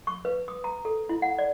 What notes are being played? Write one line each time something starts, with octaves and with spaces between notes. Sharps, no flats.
C#6
B4
D#6
A#5
A4
E4
F#5
D5